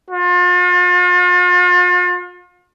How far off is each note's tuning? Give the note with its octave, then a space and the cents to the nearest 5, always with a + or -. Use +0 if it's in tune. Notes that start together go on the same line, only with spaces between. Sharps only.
F4 +40